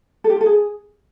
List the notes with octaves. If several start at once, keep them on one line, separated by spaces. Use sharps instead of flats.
A4
G4
F4
A4
G#4